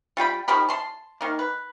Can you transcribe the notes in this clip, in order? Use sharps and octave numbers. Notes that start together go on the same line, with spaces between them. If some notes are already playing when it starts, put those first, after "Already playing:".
G3 F4 G5 B5
D#3 F3 G4 B5
A5 C6
D#3 A#3
B4